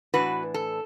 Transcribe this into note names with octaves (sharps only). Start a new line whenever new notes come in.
A2 E3 D4 F#4 B4
A4